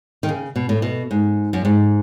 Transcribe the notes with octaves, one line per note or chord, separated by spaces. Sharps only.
D#3
C#3
B2
A2
B2
G#2
F#2
G#2